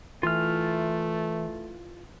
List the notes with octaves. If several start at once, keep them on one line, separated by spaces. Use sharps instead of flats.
E3 A3 F4 F6